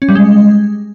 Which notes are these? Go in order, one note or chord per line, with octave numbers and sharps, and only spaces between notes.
C#4
G3
G#3